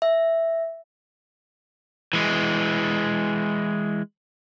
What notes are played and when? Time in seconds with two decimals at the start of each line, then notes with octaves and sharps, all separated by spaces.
0.02 E5
2.13 E3 G#3